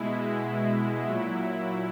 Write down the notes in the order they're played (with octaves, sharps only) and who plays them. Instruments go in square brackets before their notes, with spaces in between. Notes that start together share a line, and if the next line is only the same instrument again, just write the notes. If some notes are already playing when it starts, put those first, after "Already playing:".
Already playing: [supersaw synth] B2 G#3 E4
A#2 F#3